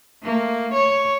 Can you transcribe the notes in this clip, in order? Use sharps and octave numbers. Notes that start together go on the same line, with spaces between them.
A3 A#3
C#5